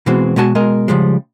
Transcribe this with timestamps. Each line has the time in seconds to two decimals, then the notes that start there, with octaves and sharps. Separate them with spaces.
0.06 B2 E3 G#3 B3 C4 F#4
0.36 B2 G#3 F#4 G#5 A5
0.55 B2 G#3 A#4 D#5
0.88 C#3 F3 G3 G#3